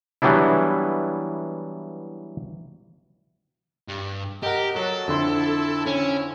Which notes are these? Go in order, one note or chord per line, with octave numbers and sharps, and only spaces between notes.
E3 F#3 G3 B3 D4 E4
G2
G4 A#4 D#5 F#5
F#3 A4
F2 D3 E4 C6
C#4